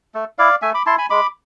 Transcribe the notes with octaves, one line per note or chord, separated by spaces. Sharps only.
A3
E4 D5 F5
A3 E5 G#5
B5 D6
E4 A5 C6
G#5 B5
G#3 B5 D6